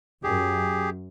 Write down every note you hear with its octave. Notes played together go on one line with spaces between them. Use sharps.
F#2 G4 G#4